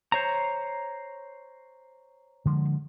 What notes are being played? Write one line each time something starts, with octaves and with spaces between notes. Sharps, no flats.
C5 C#5 A#5
D3 F3 G#3